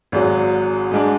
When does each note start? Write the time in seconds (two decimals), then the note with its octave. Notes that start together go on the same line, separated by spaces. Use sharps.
0.12 G#1 G#2 F#3
0.92 G#2 G#3 D4